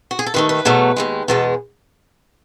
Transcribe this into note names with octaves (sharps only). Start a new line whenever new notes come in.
F#4
G#4
A4
D#2 D#3 A3 B4
B4
E2 B2 F#3 A3
D#2 D#3 G#3
E2 B2 G#3 A4